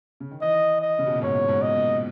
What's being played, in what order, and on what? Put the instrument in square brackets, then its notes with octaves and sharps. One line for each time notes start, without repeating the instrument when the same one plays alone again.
[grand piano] C#3
D#3
[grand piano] E3 [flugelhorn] D#5
[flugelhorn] D#5
[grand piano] C#3
B2
A#2
[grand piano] G#2 [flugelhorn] C#5
[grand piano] G#2
[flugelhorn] D#5
[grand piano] A#2